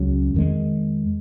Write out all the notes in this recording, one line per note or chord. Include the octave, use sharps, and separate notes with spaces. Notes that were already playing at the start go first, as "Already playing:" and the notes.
Already playing: C#2 C#3 F#3 C#4
F2 D#3 G#3